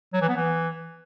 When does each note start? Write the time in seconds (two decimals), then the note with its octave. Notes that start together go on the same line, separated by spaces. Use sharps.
0.14 F#3
0.21 E3
0.29 B3
0.37 E3